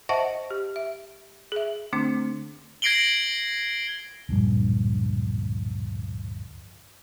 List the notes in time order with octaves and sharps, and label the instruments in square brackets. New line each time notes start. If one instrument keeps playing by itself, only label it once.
[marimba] C5 D#5 E5 F#5 A5 C#6
G4
E5
G#4 E5
D3 A3 C4 D4
[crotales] G#6 A#6 C7 D7 F#7 G7
[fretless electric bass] D1 A#1 G2